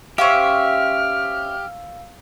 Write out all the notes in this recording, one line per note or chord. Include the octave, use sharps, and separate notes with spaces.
C#4 G4 C5 E5 F5 E6 F6